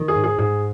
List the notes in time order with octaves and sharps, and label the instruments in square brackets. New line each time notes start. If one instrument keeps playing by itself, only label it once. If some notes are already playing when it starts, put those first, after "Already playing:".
Already playing: [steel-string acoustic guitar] D#3
[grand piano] G#4
[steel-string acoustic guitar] G#2
[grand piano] G#4
[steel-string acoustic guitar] G#2 [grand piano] G#4